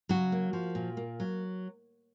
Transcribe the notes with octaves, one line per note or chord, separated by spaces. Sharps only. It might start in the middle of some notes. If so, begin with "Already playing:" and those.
C#3 F#3 F#4
A#3
F3
A#2
A#3
F#3